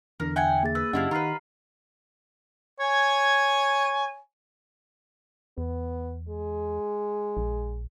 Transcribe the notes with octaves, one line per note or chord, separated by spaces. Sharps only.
E2 D3 A#4
G4 E5 F#5 G#5
A#3 G#4 A6
B4 E6
F#2 C#3 D4 E4 F4 G4 D#5 F#5
D#3 F4 B4 A#5 F6 C7
C#5 G#5
E2 B3
G#3
A#1